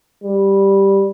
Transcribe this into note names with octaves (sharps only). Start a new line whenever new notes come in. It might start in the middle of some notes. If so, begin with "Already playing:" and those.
G3